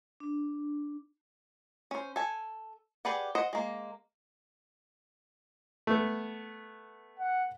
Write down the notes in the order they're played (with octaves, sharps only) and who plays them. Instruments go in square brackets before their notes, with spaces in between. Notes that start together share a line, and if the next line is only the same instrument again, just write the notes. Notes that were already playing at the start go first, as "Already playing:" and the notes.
[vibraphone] D4
[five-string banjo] C#4 C5
A4 G#5
G4 G#4 B4 D5 F#5
C5 D#5 F#5
G#3 A#3
[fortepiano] A3 B3
[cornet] F#5